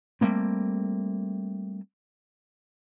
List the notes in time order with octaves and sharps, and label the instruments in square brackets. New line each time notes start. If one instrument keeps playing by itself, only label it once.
[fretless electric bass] G3 A3 A#3 C4